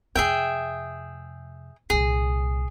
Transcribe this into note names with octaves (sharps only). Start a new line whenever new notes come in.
F2 C3 G#4 E5 G5
C2 A#2 G#4